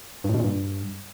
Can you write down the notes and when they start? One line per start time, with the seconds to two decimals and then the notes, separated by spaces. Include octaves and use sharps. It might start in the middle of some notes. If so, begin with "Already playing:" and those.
0.24 G2
0.29 A2
0.34 B2
0.39 A#2
0.44 G2